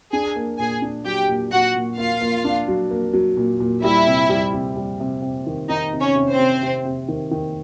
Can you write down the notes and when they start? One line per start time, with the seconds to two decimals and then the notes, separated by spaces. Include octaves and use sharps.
0.12 D4 G#4 G#5
0.36 A#3
0.59 A#2 G#4 G#5
0.82 D4
1.05 F#3 G4 G5
1.29 A#2
1.52 A#2 F#4 F#5
1.75 A#2
1.98 A#3 F4 F5
2.21 A#3
2.45 D4
2.68 F#3
2.91 A#3
3.13 F#3
3.37 A#2
3.60 A#2
3.83 G3 E4 E5
4.07 C3
4.30 G3
4.53 C3
4.76 G3
5.00 C3
5.22 C3
5.47 D#3
5.69 D#3 D#4 D#5
5.93 C3
6.00 C#4 C#5
6.15 C3
6.30 C4 C5
6.39 C3
6.62 C3
6.85 C3
7.08 D#3
7.31 D#3